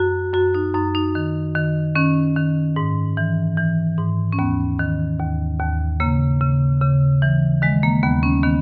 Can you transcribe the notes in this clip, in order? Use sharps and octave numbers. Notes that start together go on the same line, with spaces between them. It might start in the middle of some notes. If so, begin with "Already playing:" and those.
Already playing: F#2 F#4
F#2 F#4
D#4
F#2 D#4
D#4
D#3
D#3
D#3 C#4
D#3
G#2
E3
E3
G#2
C#4
D#2 B3
D#3
D#2
D#2
C#3 A#3
C#3
C#3
E3
D#3 G#3
A#3
D#2 B3
C#4
D#3 B3